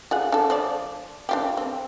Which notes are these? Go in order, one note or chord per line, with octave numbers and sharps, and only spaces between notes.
F4 G#4 F#5
D4 A4
F3 D5
D4 F4 G4
C4